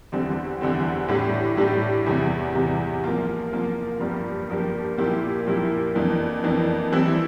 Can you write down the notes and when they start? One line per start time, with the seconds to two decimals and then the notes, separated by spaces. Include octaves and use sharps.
0.12 E2 D3 G3 C4
0.61 E2 D3 G3 C4
1.08 A2 G3 D4 G4
1.57 A2 G3 D4 G4
2.06 E2 C3 G3
2.55 E2 C3 G3
3.04 F3 A#3 F4
3.52 F3 A#3 F4
4.00 G2 F3 A#3 D4 G4
4.49 G2 F3 A#3 D4 G4
4.98 A#2 F3 A#3 E4 G4
5.46 A#2 F3 A#3 E4 G4
5.95 F2 E3 A#3 D4
6.43 F2 E3 A#3 D4
6.92 E3 G3 C4 E4